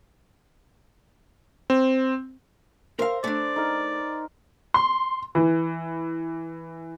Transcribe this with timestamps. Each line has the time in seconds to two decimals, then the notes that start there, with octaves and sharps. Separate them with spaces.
1.70 C4
2.99 A#4 C5 E5 F5 A#5
3.24 A3 D4 D5
3.56 D#4 A#4
4.74 C6
5.35 E3